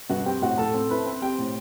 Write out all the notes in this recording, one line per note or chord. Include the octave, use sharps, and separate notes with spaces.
G2 F#4 F#5
C4 G4 G5
A2 F#4 F#5
A2 A4 A5
C4
E4 B4 B5
C4
C4 G4 G5
A2